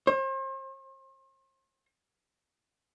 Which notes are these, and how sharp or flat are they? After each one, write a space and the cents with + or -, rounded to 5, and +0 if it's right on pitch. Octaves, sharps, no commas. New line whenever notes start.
C5 +40